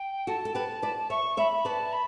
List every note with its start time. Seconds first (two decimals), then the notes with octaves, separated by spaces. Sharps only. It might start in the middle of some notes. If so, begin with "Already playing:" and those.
Already playing: G5
0.27 F#4 A4 A5
0.45 A4
0.55 G4 B4
0.82 B4 D5
1.10 C#5 E5 C#6
1.37 C#5 E5 B5
1.65 B4 D5 A5
1.92 B5